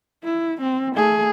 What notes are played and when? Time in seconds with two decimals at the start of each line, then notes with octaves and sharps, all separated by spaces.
0.24 E4
0.61 C4
0.95 A3 G#4